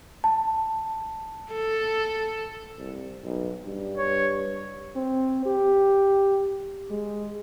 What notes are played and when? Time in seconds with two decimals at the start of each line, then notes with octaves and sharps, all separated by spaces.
0.24 A5
1.52 A4
2.79 C2
3.24 B1
3.65 G2
3.97 C#5
4.96 C4
5.46 G4
6.90 G#3